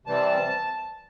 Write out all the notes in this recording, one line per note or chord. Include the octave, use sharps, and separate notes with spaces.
C3 E3 G3 C4 A5